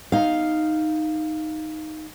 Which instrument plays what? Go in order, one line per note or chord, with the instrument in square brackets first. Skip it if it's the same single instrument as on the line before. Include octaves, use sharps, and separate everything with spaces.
[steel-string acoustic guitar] D#4 F5